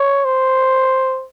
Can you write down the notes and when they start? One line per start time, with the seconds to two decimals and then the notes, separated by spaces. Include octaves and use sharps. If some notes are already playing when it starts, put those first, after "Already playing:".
Already playing: C#5
0.25 C5